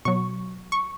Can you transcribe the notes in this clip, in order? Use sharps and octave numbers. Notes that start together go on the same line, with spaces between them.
B2 F#3 C#6
C#6